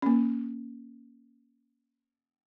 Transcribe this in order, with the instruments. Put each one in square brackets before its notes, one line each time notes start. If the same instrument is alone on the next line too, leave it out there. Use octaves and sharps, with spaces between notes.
[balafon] A#3 C#4